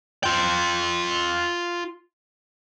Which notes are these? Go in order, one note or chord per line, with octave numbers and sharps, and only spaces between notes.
F4 G5